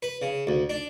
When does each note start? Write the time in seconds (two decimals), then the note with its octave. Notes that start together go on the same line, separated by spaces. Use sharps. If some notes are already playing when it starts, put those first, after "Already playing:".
0.03 B4
0.22 C#3
0.47 D2
0.70 D4